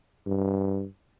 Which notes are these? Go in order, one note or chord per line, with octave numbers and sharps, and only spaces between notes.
G2